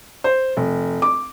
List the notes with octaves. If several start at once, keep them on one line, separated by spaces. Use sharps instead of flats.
C5
F1
D6